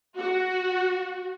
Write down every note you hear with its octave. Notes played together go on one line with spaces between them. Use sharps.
F#4